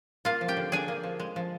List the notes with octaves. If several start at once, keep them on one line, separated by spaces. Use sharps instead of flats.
A#3 F4 F5
F3
G4 G5
D3
D4 G#4 G#5
A#3
F3
G#3
F3